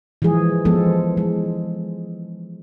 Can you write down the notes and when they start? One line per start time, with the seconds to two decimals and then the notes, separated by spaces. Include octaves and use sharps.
0.22 E3 F3 G#3 G#4
0.65 E3 F3 G#3 B3 A4
1.17 G#3